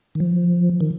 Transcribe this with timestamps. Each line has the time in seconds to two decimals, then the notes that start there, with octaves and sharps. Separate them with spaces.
0.15 D#3
0.20 F3
0.81 D#3